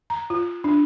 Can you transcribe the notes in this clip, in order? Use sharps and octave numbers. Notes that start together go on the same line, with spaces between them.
A#5
F4
D4